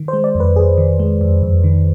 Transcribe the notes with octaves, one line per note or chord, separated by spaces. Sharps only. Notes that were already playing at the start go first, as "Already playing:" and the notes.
Already playing: D#3
C5
G#3
D5
F2
B4
F2 G#4
D#3
G#3
F2
F2
D#3